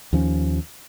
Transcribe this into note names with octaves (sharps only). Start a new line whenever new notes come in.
D#2 F3 C#4